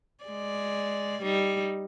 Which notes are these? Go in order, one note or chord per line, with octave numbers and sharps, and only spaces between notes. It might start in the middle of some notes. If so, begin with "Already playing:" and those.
G#3 D5
G3 D#4